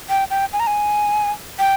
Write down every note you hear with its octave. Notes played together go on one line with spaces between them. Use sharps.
G5
G5
G#5
A#5
G#5
G5